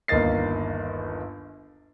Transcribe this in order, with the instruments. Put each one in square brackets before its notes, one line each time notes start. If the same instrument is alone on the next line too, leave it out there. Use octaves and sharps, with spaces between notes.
[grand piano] G1 D#2 A#3 D#5 A6 C7